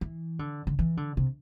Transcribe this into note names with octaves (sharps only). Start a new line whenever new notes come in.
E3
D3
D3
E3
D3
C3